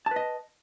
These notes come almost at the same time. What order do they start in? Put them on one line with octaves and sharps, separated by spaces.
A5 B4 D#5